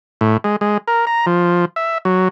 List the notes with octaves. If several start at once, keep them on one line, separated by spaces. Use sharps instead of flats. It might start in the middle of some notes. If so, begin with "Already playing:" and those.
A2
G#3
G#3
A#4
A#5
F3
E5
F#3